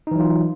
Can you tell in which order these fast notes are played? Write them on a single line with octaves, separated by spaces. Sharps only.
D#4 E3 F#3 F4